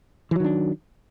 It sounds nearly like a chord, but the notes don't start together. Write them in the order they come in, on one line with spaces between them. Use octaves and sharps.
E3 F#3 D#3 D4